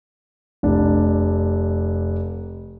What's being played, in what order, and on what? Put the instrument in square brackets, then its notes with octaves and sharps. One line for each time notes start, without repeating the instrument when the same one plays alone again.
[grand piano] F1 D4